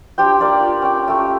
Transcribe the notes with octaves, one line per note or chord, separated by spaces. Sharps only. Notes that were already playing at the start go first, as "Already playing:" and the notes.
D4 G4 C5 G5
A#3 D5 F5
F4
C#4 G5
A3 G4